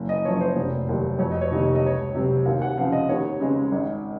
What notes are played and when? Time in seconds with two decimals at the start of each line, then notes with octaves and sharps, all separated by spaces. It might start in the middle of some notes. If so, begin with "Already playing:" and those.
Already playing: F#1
0.09 D#5
0.25 F#2 F3 C#5
0.41 C5
0.56 F1
0.88 D#2 D#3 F#3
1.19 F2 C#5
1.31 D#5
1.41 C#5
1.51 C3 D#3 A#3 D#5
1.63 C#5
1.75 D#5
1.82 C#2 C#5
2.15 C3 F#3 C4
2.45 D#2 F5
2.62 F#5
2.78 C#3 F3 C4 F5
2.92 D#5
3.09 D#2 C#5
3.40 C#3 G#3 C4
3.72 G#1